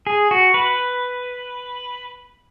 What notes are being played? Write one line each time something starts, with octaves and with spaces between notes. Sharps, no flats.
G#4
F#4
B4